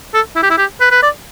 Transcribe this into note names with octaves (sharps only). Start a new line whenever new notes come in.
A4
E4
G4
E4
G4
B4
B4
D5